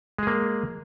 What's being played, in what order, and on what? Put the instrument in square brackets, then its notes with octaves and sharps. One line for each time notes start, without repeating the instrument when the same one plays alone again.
[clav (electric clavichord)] G#3
G#4
A#3